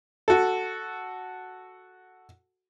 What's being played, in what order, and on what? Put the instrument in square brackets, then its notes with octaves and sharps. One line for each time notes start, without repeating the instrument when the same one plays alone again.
[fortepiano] F#4 A4